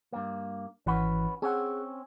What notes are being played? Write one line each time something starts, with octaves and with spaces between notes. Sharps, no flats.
G2 A#3
G#1 E3 C#4 F#4 B4 F#5
C4 C#4 G#4 F#5